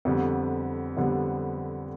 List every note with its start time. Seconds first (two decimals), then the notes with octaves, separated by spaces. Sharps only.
0.05 F2 D3 G3 B3
0.97 F2 D3 G3 B3